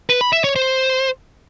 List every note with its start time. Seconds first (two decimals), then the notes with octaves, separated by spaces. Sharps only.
0.09 B4
0.21 B5
0.33 E5
0.44 C#5
0.56 C5